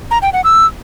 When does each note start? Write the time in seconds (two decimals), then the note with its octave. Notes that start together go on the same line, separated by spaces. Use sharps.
0.11 A#5
0.22 G5
0.33 F#5
0.44 E6